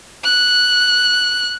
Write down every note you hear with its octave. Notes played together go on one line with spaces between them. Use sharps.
F#6